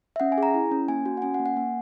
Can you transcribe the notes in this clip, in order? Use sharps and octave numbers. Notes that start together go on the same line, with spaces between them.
E5
C#4 F#5
G#5
G#4 A#5
E4
C#4
A#3 G#5
F#4
F#5
C#4 G#5
F#5
A#3
F#5
A#3 G#5